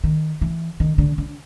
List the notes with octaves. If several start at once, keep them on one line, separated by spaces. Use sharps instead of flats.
D#3
E3
D#3
D3
D3